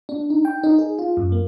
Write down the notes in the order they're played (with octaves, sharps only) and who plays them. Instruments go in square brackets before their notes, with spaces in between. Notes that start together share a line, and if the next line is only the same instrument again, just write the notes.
[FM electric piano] D4
D#4
G5
D#4
G#4
F4
F#2
A#3